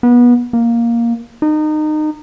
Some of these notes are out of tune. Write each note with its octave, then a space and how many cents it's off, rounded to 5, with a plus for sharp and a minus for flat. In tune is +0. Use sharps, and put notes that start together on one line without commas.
B3 -25
A#3 +5
D#4 -25